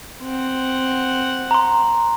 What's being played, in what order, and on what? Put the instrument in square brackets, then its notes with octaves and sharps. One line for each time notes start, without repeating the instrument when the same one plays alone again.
[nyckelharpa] C4 F#5
[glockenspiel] A#5 C6